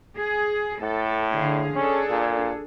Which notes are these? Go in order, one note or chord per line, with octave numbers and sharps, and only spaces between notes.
G#4
A2 A4
D3 G#4 F5
C#4 D4 G#4 A4
A#2